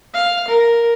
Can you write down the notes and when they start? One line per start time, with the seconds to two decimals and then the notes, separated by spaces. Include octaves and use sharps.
0.14 F5
0.48 A#4